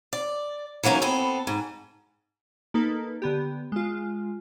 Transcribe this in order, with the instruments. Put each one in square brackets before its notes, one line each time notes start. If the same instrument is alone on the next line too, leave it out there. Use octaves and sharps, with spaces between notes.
[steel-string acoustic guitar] D5
E3 F#3 A#3 C#4 D#4
B3 C4 A4
G#2
[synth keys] A#3 D#4 A4 B4
D3 B3 G4
G#3 F4